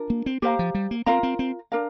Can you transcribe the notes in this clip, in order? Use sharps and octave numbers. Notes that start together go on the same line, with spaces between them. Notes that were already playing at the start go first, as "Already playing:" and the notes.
Already playing: D4 F4 A#4
A#3
C4
A#3 G4 C5 F5 A#5
F3
G3
A#3
C4 F4 A#4 F5 A#5
C4
C4
D4 A#4 F5 A#5